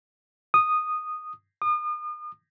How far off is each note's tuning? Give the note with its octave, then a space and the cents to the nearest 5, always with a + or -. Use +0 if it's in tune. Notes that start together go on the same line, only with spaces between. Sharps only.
D#6 -10
D#6 -40